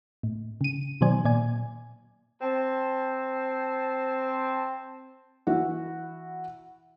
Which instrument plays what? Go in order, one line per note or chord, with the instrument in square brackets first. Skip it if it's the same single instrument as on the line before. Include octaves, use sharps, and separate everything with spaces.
[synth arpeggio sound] A2
C#3 D#7
B2 D#3 F#3 C5 D5 G#5
A#2 D5 G#5
[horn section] C4 A5
[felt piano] E3 E4 F#4